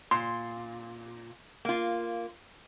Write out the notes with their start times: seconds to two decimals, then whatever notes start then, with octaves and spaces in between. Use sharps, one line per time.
0.11 A#2 C6
1.65 A#3 F4